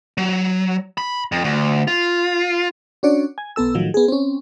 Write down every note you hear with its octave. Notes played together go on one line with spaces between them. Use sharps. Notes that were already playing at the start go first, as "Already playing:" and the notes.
F#3
B5
F2
D2
F4
C#4 D4 F#4 C#5 D5
G#5
B1 B3 A4 E6
A2 D#3 F3 F#3
B3 G#4
C4 C#4